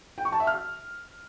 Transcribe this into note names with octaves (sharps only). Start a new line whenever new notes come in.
G5
C#6
A5
E5
F6